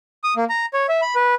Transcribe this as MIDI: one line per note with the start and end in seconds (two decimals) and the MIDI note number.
0.24 0.34 87
0.36 0.45 58
0.50 0.66 82
0.74 0.87 73
0.89 1.01 76
1.02 1.15 83
1.16 1.35 71